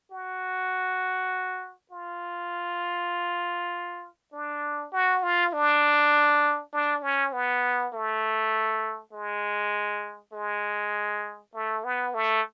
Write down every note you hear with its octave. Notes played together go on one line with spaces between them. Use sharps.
F#4
F4
D4
F#4
F4
D4
D4
C#4
B3
A3
G#3
G#3
A3
B3
A3